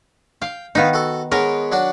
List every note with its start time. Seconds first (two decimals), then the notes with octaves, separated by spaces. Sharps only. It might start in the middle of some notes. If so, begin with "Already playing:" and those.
0.42 F5 G5
0.75 D#3 B3 D#4 B4 F5
0.93 F#4 A4
1.32 G#3 B3 A#4 C#5
1.72 F#3 D4 F#4